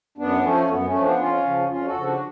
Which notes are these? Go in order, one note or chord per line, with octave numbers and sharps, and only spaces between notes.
F#2 B3 D4
F3 A3 C#4
F#2 B3
A3 C#4
F3
B3 D4
F2 C#4 F4
C#3 F3
F2 C#4 F4
F#4 A4
C#3 F3
D4 F#4